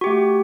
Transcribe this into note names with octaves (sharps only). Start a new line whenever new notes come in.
A3 F#4 G4